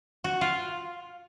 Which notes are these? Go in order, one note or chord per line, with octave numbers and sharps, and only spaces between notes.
F#4
F4